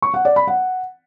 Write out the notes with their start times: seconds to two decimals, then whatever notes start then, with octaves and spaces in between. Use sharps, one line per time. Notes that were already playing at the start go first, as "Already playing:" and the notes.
0.02 C#6
0.14 F#5
0.25 D5
0.36 B5
0.47 F#5